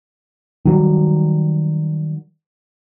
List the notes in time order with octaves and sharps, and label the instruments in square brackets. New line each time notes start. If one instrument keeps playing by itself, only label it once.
[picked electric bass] D#3 F#3 G3